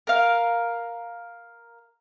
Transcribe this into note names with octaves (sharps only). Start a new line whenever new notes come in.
A#4 F5